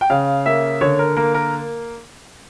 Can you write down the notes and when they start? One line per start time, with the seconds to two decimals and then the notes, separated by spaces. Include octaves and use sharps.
0.01 G5
0.10 C#3 F5
0.46 A#3 E5
0.81 D3 C#5
0.99 A#4
1.17 A#3 A#4
1.34 A#4